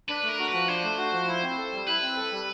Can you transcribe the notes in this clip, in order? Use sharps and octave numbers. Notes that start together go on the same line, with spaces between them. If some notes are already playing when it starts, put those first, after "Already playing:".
D4 B4
A3
A#4
F#4
F3 B4
D4 C5
A3
F#4
F3
E4
C4
A4
G3
E4 B4
C4
A4
G3